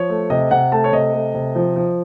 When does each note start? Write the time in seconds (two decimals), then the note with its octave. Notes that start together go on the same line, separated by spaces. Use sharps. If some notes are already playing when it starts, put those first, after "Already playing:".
Already playing: F3 C#5
0.10 A3
0.30 C3 D#5
0.51 C3 F#5
0.72 A3 A5
0.84 C#5
0.92 C3 D#5
1.14 A3
1.35 C3
1.55 F3
1.76 F3